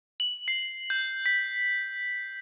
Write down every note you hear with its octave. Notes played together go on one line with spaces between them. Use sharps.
F#7
C7
G6
B6